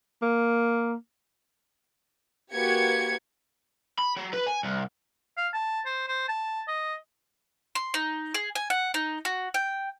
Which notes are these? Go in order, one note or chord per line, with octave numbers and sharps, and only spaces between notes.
A#3
A#3 F#4 G4 B4 G#6 C#7
B5
F#3
B4
G#5
C2
F5
A5
C5
C5
A5
D#5
C6
D#4
G#4
G#5
F#5
D#4
F#4
G5